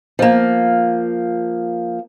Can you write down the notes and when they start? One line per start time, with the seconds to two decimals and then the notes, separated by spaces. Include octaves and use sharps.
0.19 F3 A#3